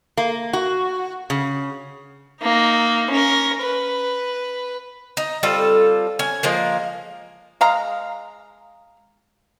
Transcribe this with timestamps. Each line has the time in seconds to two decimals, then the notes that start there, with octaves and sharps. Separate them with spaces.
0.17 A#3
0.53 F#4
1.30 C#3
2.41 A#3 D#4
3.10 C#4 A#4
3.62 B4
5.17 D#4
5.43 G3 C4 F4 A4
6.19 C#4 G#5
6.43 F3 G#3 A#3
7.61 G#3 F5 A#5